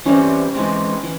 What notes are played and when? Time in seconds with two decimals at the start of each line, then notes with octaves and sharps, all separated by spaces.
0.06 E3 G3 C4 C#4
0.55 E3 G#3 C4
1.03 E3